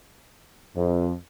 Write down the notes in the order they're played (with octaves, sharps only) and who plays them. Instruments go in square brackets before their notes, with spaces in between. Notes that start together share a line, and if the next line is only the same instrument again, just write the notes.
[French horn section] F2